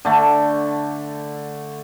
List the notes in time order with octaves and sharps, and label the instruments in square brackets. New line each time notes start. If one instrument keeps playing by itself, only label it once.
[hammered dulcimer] D3 A3